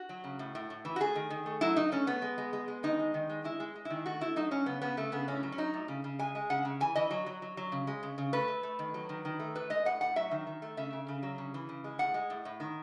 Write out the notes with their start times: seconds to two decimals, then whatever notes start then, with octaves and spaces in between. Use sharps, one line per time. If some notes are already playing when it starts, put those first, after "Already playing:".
Already playing: F#4
0.09 F#3
0.24 C#3
0.39 A2
0.55 A2
0.70 A2
0.85 E3
0.96 F#4
1.00 A3 G#4
1.15 D#3
1.30 D#3
1.46 A3
1.61 F#3 E4
1.77 F#3 D#4
1.92 A3 C#4
2.07 A3 B3
2.22 G#3
2.38 G#3
2.53 G#3
2.68 G#3
2.83 D#3 D#4
2.99 G#3
3.14 D#3
3.29 G#3
3.44 G#3 E4
3.60 G#3
3.75 G#3
3.85 D#3 E4
4.06 A3 F#4
4.21 A3 E4
4.36 F#3 D#4
4.51 F#3 C#4
4.66 C#3 B3
4.82 C#3 B3
4.97 C#3 A3
5.12 C#3 B3
5.28 A2 C#4
5.43 F#3
5.52 C#4
5.58 F#3 D#4
5.74 A2
5.88 C#3
6.04 C#3
6.19 G#3 G#5
6.35 G#3
6.50 C#3 F#5
6.65 C#3
6.80 E3 G#5
6.95 E3 D#5
7.11 F#3
7.26 F#3
7.42 F#3
7.57 F#3
7.72 C#3
7.87 G#3
8.03 C#3
8.18 C#3
8.33 A3 B4
8.48 A3
8.63 A3
8.79 D#3
8.94 F#3
9.09 D#3
9.25 D#3
9.39 A3
9.55 A2 B4
9.70 G#3 D#5
9.85 A2 F#5
10.01 A2 F#5
10.16 F#3 E5
10.31 D#3
10.47 D#3
10.62 A3
10.77 C#3 E5
10.93 C#3
11.08 C#3
11.23 F#3
11.38 C#3
11.54 E3
11.69 C#3
11.84 G#3
11.99 A2 F#5
12.14 G#3
12.30 A2
12.45 A2
12.60 D#3